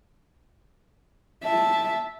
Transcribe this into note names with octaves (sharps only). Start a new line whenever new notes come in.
E5 A5